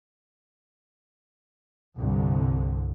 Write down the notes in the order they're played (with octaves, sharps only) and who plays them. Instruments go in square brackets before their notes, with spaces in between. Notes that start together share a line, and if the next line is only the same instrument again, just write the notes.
[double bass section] C2 G2 D3